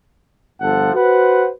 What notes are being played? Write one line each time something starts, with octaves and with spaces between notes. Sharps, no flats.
G1 F3 A4 F#5
F#4 B4 C5 F#5